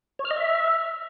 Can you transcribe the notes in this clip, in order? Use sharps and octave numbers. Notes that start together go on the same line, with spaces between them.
C#5
F6
D#5
E5